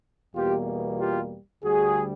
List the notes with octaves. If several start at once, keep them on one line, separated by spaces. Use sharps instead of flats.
E2 B2 G3 A#3 F4 G4
F4 G4
D2 D3 G3 F#4 G#4